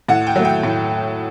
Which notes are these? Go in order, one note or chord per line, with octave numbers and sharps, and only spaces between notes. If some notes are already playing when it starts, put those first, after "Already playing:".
A2 F#5
G5
F#3 A3
G5
A2